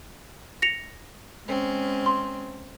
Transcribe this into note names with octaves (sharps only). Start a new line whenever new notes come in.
A#6 C#7 F7
G#3 C4 C#4
C6